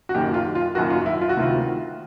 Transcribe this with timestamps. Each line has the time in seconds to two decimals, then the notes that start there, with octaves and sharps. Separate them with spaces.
0.09 F#4
0.15 F#1 F#2 D#3 G4
0.34 F4
0.55 F4
0.75 F#1 F#2 D#3 F#4
0.90 F4
1.06 E4
1.21 F4
1.29 F#4
1.37 D2 C3 D#3 F4